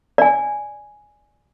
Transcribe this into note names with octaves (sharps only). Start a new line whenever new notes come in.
D5 G#5